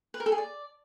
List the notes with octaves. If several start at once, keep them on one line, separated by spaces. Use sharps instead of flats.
B4
A#4
A4
G#4
D5